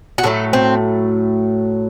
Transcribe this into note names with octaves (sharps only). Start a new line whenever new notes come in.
F#4
A2 F#3 A3 A4
C4